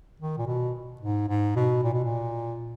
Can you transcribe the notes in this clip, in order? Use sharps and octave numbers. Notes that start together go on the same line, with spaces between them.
D#3
A#2
B2
G#2
G#2
B2
A#2
B2
A#2